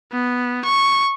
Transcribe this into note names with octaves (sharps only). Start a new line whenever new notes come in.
B3
C#6